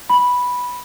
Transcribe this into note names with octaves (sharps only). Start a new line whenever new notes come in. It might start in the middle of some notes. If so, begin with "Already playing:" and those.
B5